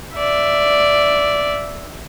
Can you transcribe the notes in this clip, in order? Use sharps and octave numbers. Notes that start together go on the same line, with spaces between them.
D5 E5